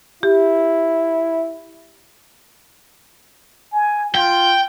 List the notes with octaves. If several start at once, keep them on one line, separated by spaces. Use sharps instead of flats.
E4 G4
G#5
F4 G5